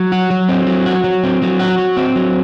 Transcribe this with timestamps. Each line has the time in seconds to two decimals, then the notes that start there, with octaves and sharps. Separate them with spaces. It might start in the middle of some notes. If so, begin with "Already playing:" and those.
Already playing: F#3
0.12 F#4
0.30 F#3
0.49 C4
0.67 F#3
0.86 F#4
1.04 F#3
1.24 C4
1.42 F#3
1.60 F#4
1.78 F#3
1.97 C4
2.16 F#3